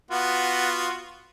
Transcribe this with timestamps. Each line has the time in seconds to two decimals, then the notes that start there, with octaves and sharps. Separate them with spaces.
0.11 B3 F4 F#4